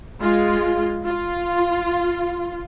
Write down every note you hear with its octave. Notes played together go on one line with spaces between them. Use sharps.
G#3 F4
F4